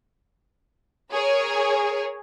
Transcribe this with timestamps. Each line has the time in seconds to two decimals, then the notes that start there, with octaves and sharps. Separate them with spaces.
1.12 G#4 A#4 C#5